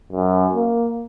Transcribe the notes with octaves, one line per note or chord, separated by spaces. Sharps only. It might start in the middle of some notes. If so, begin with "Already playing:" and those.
F#2
A#3